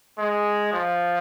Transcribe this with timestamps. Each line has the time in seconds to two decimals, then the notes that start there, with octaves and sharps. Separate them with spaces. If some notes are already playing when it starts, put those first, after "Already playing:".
0.19 G#3
0.72 F3